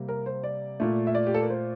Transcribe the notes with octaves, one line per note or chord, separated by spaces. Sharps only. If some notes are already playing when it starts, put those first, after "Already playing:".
Already playing: C3 G3 A#3
A#4
C5
D5
A#2 A3
E5
D5
G4
A4
A#4
C5